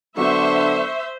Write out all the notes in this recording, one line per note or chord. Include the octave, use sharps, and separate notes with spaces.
D3 F#3 B3 D4 C5 E5 C#6